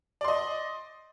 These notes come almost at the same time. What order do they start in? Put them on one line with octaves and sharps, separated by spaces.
D5 C6 D#5